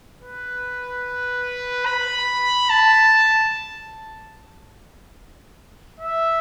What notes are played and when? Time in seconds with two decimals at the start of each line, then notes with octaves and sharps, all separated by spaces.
0.21 B4
1.86 B5
2.70 A5
5.99 E5